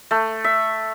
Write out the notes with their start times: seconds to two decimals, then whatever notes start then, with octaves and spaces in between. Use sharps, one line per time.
0.11 A3
0.44 E5